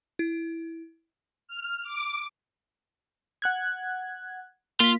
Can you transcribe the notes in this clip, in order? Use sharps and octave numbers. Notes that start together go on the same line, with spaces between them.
E4
F6
D6
F#5 F#6 G#6
A#3 F4 B6